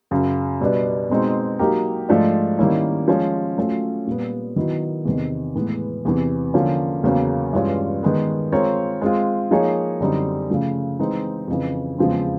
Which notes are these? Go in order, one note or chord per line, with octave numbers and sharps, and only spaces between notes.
F#2 C#3 F#3
B2 G3 B3 D4
B2 G#3 C4 D#4
F#3 A#3 D#4 G4 A#4
G#2 F3 A3 D4
D#3 G3 A#3 C#4 E4
F3 G#3 C#4
F#3 A3 C#4 F4
A#2 G3 B3
D#3 F#3 B3 E4
E2 C3 D#3
A2 E3 G#3 B3
E2 C3 E3
D3 F3 A#3 C#4
E2 C#3 F#3 A#3 C#4
G2 E3 G#3 C#4 F4
D#3 G#3 B3
G#3 C4 F4 A#4 C#5
G#3 C4 F4
F3 A#3 D#4 G#4 C#5
F#2 D3 G3 C4 D#4
C#3 F3 A3
E3 G#3 C4 D#4
F2 C#3 E3
E2 C#3 F3 G#3 C4